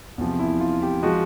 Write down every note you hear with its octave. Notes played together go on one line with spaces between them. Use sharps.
E2 C3 F3
E4
F4
G4
F3 G#3 F#4